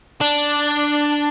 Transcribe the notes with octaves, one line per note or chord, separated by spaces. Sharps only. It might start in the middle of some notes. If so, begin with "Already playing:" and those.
D4